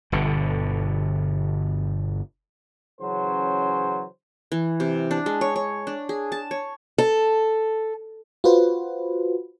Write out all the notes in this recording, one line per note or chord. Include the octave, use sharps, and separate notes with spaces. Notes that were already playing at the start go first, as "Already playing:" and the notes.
G1 B2 D3
C#3 E3 F#3 C#4 C5
E3
C3
D4
G#3
C#5
C#5
D4
G#4
A5
C#5
A4
F4 F#4 B4 C5